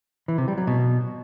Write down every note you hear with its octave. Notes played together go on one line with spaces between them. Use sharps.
E3
C3
G3
F#3
B2